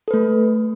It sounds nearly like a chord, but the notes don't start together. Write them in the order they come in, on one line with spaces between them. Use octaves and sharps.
A4 B4 A3